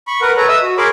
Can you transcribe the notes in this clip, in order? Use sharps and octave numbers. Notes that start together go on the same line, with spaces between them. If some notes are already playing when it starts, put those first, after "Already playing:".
B5 C#6
A#4 B4 F#5
A4 B4 C#5 A#5
D#5 E5 D#6 E6
F#4
G#4 A#4 C#5 B5 C6 D6